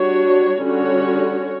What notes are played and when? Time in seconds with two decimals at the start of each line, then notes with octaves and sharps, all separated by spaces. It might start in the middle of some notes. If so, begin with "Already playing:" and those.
Already playing: G3 D4 F#4 C#5
0.63 D3 G3 C#4 F#4 C#5